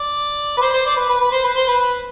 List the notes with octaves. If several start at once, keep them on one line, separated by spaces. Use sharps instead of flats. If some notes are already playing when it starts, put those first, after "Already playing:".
Already playing: D5
B4
C5
C5
D5
B4
B4
B4
C5
B4
C5
B4